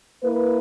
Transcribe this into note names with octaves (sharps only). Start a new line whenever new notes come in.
A#3 E4 B4